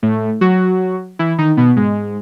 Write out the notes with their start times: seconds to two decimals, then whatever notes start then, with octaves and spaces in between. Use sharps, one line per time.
0.03 A2 A3
0.41 F#3 F#4
1.19 E3 E4
1.38 D#3 D#4
1.57 B2 B3
1.76 G#2 G#3